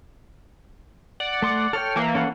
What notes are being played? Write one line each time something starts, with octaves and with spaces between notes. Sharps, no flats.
D5 F#5
A3 C6 D6
A4 C#5 G5 F6
E3 A#3
C#4 A4 F#5